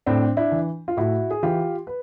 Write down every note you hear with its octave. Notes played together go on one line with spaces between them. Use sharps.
A2 C4 D4
D4 E4
E3
F4
A2 E4 F#4
G#4
E3 F4 G4
B4